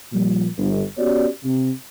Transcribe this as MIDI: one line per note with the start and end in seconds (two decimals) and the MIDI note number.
0.12 0.47 46
0.12 0.47 53
0.12 0.47 55
0.58 0.83 31
0.98 1.27 59
0.98 1.27 61
0.98 1.27 66
0.98 1.27 67
0.98 1.27 73
0.98 1.27 74
1.44 1.71 48